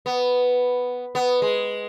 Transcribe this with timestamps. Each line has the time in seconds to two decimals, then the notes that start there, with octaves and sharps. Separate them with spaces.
0.06 B3
1.15 B3
1.42 G#3